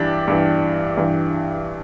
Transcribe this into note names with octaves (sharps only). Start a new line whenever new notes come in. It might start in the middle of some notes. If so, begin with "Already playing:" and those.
Already playing: G2 E3 D4 G4
G2 E3
G2 E3